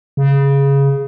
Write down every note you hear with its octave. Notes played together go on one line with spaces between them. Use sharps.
C#3